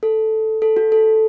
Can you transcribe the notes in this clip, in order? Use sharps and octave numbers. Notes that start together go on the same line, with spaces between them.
A4
A4
F#4
A4